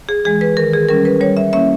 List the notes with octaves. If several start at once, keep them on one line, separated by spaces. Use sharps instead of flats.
G#4
E3 G#3 G#4
B4
D#3 A#4
G#4
G3 C#4 A#4
B4
G3 C#5
E5
A#3 C#4 E4 E5